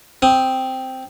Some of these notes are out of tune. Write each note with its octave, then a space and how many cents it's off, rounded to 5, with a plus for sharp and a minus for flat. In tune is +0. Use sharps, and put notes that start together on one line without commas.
C4 +0 D#6 +0